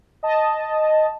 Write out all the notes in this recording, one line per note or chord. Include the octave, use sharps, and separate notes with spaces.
D#5 A5